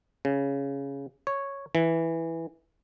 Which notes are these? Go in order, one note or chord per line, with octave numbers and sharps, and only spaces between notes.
C#3
C#5
E3